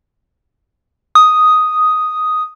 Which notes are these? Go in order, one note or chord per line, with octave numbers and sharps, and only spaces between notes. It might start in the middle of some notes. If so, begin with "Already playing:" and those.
D#6